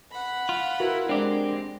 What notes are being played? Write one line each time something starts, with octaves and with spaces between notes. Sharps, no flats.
F#5 B5
F4
E4 F#4 A#4 B4
G#3 C4 D4 G4 A#4 D5